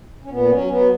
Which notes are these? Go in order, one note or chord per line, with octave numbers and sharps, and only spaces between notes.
C#4
A#2 B3
F#3 C#4
F#3 B3